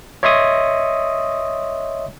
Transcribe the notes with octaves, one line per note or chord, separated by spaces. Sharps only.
C#5 D#5 E5 C6 C#6 D#6